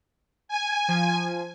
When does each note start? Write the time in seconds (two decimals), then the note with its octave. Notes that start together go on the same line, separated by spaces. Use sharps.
0.48 G#5
0.88 F3